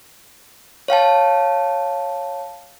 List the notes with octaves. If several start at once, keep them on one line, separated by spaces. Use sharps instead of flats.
C#5 F5 G5 A5